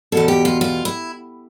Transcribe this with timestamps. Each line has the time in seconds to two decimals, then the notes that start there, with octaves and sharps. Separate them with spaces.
0.12 E2 B2 A4
0.28 G4
0.45 F4
0.61 F4
0.85 E4